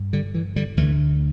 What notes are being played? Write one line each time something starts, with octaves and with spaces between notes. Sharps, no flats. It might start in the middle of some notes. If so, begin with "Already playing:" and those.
Already playing: G2
D3 G3
E3
D3 G3
D2 D3 E3 A3